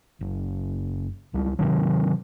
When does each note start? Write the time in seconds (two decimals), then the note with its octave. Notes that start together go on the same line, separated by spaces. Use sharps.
0.21 F#1
1.34 C#2 G3
1.59 C3 D#3 F#3